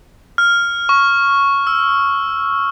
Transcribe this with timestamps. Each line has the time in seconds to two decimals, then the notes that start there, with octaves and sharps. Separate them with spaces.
0.38 F6
0.89 C#6
1.67 E6